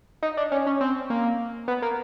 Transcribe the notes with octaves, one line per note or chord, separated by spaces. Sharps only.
D#4
D4
C#4
C#4
C4
A#3
B3
A#3